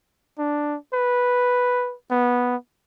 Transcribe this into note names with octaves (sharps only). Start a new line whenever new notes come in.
D4
B4
B3